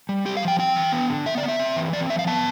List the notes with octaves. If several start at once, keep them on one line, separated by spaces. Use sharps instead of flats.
G3
C4 G4
F5
F3
G5
C4 G5
E3
B3
D3
B3 E5
D5
B3
E5
C4
E3
C4 D5
F3 E5
F5
B3 A5